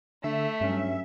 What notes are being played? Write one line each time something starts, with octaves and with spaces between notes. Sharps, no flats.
D3 A3 E5
G2 F#3 C#4